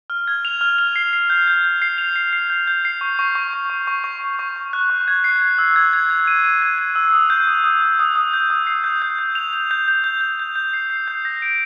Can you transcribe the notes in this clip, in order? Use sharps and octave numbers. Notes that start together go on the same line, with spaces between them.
F6
G#6
F7
F6
F7
C7
C7
G6
G6
G6
C7
F7
C7
C7
G6
G6
C7
C#6
C#6
C#6
C#6
C#6
C#6
C#6
C#6
C#6
C#6
F#6
C#6
G#6
C7
G#6
E6
G#6
G#6
G#6
D#7
D#7
G#6
D#7
E6
D#6
G6
D#6
D#6
D#6
D#6
D#6
G6
D#6
C7
G6
G6
G6
F7
F7
G6
G6
G6
G6
G6
G6
C7
C7
G6
A#6
D7